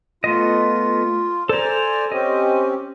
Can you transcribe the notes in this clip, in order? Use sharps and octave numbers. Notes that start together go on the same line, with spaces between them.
A3 B3 F4 D#5
A4 C5 D5 G#5 A#5
C4 C#4 G4 D#5